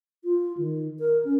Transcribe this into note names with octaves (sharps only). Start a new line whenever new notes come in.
F4
D#3
A#4
C#4